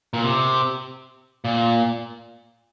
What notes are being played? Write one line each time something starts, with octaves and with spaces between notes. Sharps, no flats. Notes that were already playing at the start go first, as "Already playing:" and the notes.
A#2
C3
A#2